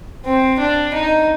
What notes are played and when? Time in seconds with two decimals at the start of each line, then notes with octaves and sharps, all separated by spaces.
0.25 C4
0.59 D4
0.94 D#4